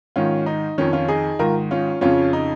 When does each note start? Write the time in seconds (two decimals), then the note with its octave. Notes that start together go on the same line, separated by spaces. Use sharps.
0.16 G#2 D#3 C#4 F4
0.46 D#4
0.78 F2 D#3 C#4
0.93 C#4 F4
1.08 D#4 G#4
1.39 G#2 D#3 F4 A#4
1.71 C#4 F4
2.01 F2 C#3 C#4 F4
2.33 D#4